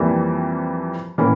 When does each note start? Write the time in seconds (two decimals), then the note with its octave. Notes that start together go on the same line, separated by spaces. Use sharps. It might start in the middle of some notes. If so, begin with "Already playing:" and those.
Already playing: F2 E3 G3 A#3
1.18 A2 E3 A#3 C#4 E4